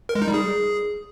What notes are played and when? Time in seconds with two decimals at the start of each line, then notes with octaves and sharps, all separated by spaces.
0.09 A#4
0.15 G#3
0.22 D#4
0.28 G3
0.34 G#4